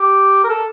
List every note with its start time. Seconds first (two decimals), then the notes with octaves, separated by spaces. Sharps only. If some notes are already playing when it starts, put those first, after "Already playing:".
Already playing: G4
0.44 A#4
0.49 A4